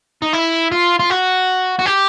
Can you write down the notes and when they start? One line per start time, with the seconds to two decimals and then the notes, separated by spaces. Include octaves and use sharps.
0.22 D#4
0.33 E4
0.72 F4
0.99 F4
1.10 F#4
1.79 F#4
1.86 G4